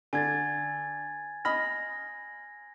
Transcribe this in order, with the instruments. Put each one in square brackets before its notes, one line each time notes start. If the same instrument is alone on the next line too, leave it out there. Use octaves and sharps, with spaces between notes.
[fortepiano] D3 [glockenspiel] G#5 G#6 A6
[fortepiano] D#5 B5 F6 [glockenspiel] A#6